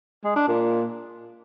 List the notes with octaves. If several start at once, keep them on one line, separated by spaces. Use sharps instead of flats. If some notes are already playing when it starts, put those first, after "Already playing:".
G#3
D4
A#2